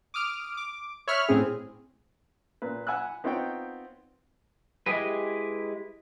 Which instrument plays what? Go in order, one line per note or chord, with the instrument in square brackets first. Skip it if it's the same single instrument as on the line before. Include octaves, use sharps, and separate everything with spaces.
[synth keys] D6 D#6 F6 D7
D6
C#5 E5 B5 F6 F#6
A2 C4 C#4 G#4
[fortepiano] A#2 B4
F#5 G#5 B5 E6 F#6
B3 C4 D#4 F4 C#5 G5
[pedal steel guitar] G#3 E4 G4 G#4 B4